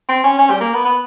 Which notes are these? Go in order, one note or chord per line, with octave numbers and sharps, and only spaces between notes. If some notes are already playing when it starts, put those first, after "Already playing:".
C4
C#4
C#4
G3
A#3
B3
B3